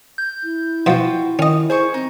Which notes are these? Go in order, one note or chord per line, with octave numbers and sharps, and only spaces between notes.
G6
E4
B2 F3 F4 F#4 G5
D#3 C#4 D#5
G#4 C5 G#5 C#6
C4 D#4